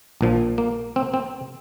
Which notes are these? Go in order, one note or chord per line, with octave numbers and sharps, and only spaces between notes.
A#1 A#2 F3
A#3
C4
C4